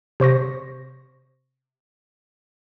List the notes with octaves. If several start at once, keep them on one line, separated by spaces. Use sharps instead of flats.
C3 C5 C#6 A#6